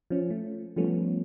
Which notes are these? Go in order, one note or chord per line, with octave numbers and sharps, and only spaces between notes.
F3 C#4
A3
F3 G3 A3 B3 C#4